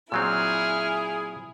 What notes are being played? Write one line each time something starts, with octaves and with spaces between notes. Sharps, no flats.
A#2 F#3 C4 E4 G#4 F6